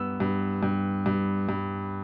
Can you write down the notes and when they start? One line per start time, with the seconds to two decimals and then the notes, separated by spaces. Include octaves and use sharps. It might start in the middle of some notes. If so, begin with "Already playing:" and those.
Already playing: G2 B3 E6
0.20 G2
0.63 G2
1.06 G2
1.49 G2